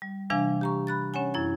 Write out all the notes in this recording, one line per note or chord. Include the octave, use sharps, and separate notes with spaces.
G3
C3 E3 G3 D4 F5 G#5
G4 A#5 C#6
B5 F#6 A6
C#4 C#5 F#5 G#5
F#2 E4 G#6